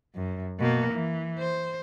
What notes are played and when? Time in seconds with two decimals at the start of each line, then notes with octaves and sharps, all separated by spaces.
0.15 F#2
0.59 B2 A#3
0.93 E3
1.39 C5